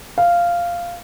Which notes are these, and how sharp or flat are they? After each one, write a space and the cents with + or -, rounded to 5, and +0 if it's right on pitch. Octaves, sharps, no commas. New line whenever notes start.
F5 -10